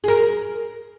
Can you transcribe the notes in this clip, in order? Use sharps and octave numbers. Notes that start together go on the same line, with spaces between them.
G#4 A#4